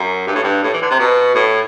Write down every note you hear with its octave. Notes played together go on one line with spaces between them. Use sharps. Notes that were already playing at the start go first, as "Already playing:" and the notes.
Already playing: F#2
G2
A2
G2
A2
E3
D3
C3
B2
A2